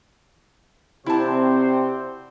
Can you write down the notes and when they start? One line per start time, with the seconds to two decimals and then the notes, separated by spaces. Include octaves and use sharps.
1.06 C3 C4 E4 F#4 C5 D5 A5